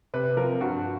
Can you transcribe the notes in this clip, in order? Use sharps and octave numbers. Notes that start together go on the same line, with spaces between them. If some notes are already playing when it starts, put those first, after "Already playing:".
C3 B4
F3 A#4
G2 F#4